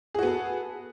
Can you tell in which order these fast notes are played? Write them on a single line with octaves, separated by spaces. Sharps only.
G#4 F#4 B3 A4